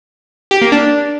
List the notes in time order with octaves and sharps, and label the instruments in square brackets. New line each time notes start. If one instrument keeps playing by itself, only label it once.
[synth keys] G4
A#3
D4